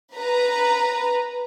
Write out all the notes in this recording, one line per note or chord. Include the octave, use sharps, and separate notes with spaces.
B4 A#5